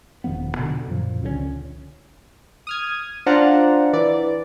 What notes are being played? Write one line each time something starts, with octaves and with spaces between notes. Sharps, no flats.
E1 D#3 F3 B3
B2 D3 D#3
F#2 A#2 F3
C#2 D3 F#3 C#4
D#6 F6 G#6
D4 F4 C5 D5 F#5 A#5
E3 D5